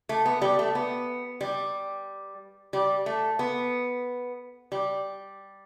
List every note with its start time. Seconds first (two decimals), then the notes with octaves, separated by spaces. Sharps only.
0.09 A3
0.26 B3
0.42 G3
0.59 A3
0.75 B3
1.41 G3
2.73 G3
3.06 A3
3.39 B3
4.72 G3